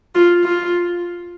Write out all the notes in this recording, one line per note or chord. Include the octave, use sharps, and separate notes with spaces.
F4
F4